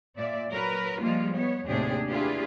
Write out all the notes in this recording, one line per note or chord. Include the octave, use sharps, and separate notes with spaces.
A#2 D5 E5
F#3 A#4 B4
F3 G3 G#3 A#3 F4
B3 C#5
D#2 A2 C3 D4 G4 G#4
D4 E4 F4 G4 G#4 B4